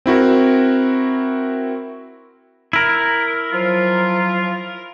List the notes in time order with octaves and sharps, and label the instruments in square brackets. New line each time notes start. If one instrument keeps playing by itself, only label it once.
[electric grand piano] C4 E4 F#4 A#4
[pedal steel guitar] E4 A#4
[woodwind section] F3 F#3 F4